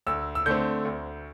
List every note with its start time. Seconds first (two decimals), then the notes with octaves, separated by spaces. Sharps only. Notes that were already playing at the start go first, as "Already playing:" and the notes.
0.07 D2 E6
0.35 E6
0.46 D3 A3 C4 G6
0.85 D2